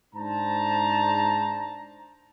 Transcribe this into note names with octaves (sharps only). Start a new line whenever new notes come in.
G#2 D4 C5 A5 A#5